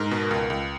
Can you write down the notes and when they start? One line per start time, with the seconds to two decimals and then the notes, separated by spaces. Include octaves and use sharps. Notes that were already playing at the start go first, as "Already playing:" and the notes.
Already playing: G#2 A#4
0.11 B2
0.31 C#2
0.50 C#2